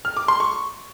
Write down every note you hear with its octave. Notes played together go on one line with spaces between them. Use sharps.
F6
D6
C6
C#6